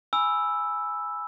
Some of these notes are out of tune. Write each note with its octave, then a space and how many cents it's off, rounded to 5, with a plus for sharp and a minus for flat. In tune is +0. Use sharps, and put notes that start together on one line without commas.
G#5 +0 B5 +0 E6 +0